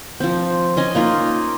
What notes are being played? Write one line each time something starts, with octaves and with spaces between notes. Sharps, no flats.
F3 C4
C#4 D#5 G#5
A#3 D#4 F4